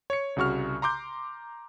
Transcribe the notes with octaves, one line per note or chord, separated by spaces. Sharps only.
C#5 C#7
C2 C#3 F#4 C#6 F6
A#5 C6 D6 G6